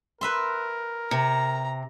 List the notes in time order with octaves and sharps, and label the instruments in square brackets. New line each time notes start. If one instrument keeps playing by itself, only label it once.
[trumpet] A#4 [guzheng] B4 E5 C6
[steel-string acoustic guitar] C3 [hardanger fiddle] A#5